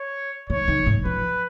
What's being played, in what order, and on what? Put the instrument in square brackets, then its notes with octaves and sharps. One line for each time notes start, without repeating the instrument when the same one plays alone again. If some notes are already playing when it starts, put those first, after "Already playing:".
Already playing: [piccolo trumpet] C#5
[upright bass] D#3 [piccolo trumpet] C#5
[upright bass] D#3
G#2
[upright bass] F3 [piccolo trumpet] B4